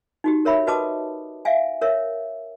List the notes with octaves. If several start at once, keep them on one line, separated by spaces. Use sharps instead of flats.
D#4 F#4 G4
A#4 C#5 E5 B5
F#4 B4 D#5 A5 D6 D#6
E5 F5 G#5
A#4 C#5 E5